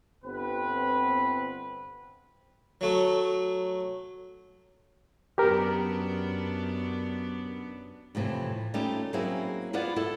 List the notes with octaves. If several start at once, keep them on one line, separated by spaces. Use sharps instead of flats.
G1 B3 C4 B4
F#3 A3
F#2 B3 D4 G4 A#4
F2 A2 C3 E3
G3 A3 C#4 D#4 F4 G4
F#3 A#3 C4 C#4 E4 G#4
B3 E4 F4 B4 D5 F#5
E4 A4